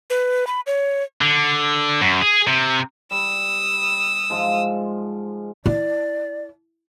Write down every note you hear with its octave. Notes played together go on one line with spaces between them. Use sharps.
B4
B5
C#5
D3
F#2
G#4
C3
G3 D#6 E6
G#2 F3 G#3
E4 D5